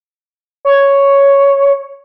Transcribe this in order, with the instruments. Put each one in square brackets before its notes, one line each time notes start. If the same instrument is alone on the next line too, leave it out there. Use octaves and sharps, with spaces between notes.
[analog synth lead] C#5